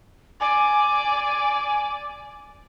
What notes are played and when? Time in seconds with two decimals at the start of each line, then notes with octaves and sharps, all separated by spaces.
0.41 D5 G#5